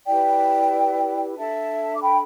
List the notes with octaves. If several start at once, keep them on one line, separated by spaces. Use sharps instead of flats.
E4 G4 B4 D5 G5
D4 A4 E5 A5
D6
G5 B5